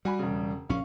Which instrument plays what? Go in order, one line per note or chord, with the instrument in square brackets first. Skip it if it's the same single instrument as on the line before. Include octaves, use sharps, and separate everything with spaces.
[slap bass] G3 [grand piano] F#4 G#5 B5
[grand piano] E1 C#3
[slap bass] A#1 C#3 C#4 [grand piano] F5 C#6